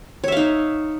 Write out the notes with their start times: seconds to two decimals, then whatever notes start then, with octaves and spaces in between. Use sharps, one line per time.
0.24 C#5
0.28 E5
0.32 F5
0.37 D#4